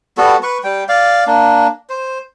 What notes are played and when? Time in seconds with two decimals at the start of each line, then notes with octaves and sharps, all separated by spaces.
0.18 G3 B3 F#4 A4
0.43 B4 C#6
0.64 G3 G5
0.89 D5 F5
1.27 A#3 D4
1.90 C5